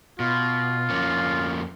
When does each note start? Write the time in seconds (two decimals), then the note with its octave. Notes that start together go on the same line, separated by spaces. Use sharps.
0.20 B2 F4
0.90 F2 A#3 C#4